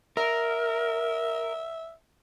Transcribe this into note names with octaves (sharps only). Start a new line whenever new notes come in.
A#4 E5